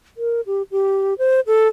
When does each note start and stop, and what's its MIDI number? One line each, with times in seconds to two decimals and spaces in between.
0.17 0.41 70
0.46 0.62 67
0.71 1.14 67
1.18 1.40 72
1.47 1.68 69